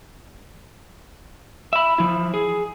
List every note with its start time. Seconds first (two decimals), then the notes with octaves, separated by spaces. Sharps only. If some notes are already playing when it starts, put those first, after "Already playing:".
1.73 E5 B5
1.98 F3 E4
2.34 G#4